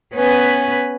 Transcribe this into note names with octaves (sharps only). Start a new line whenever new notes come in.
B3 C#4 B4